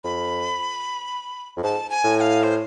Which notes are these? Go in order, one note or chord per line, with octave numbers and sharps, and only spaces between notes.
F2 B5
F2
G#2 A5
G#5
A2
G#5
F5
C5